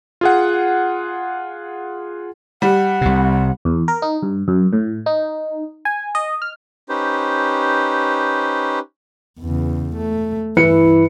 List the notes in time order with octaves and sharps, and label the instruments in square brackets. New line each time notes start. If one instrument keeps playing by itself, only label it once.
[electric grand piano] F4 G#4 F#5
[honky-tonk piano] G3 [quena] F#5
[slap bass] C2 C3
[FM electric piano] E2
A#4
D#4
G2
F#2
A2
D#4
G#5
D#5
F6
[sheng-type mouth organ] C#4 D#4 G4 B4 C5
[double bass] E2 C#3
A3
[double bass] G2 E4 [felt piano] E3 B4 C#7